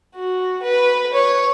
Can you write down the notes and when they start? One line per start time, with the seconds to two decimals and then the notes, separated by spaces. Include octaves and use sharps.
0.15 F#4
0.62 B4
1.14 C#5